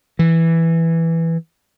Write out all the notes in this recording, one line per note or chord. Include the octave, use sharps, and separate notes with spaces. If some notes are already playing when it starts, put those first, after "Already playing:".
E3